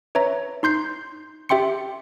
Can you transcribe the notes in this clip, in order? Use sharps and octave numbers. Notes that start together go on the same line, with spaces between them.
B4 C#5 E5 A#5
D#4 C6 G6 C7
G4 E5 G5 C6 C#7